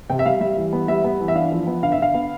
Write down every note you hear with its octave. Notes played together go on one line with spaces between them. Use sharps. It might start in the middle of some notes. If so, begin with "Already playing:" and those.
C3 G5
E5
G3 F5
G3 E5
E3
B3
G3 E5
B3
E3
E5
D4 F5
F3
B3
D3 F5
E5
D3 F5
B3